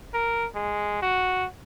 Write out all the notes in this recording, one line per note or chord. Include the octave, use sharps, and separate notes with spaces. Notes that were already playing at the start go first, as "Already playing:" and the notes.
A#4
G#3
F#4